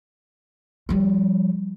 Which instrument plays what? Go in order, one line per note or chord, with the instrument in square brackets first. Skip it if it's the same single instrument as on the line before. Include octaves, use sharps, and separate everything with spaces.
[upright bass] F3 G3